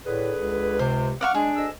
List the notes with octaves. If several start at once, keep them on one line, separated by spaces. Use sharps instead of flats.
A2 D3 G#4 B4
C#2
C3 C5
D5 F5 F#5 C#6
G#3 D4 G#4
D2 D#5 E6